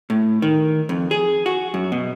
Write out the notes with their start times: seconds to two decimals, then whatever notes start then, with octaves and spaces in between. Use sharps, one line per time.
0.10 A2
0.42 D#3
0.89 F2
1.11 G#4
1.46 F#4
1.74 F#2
1.92 B2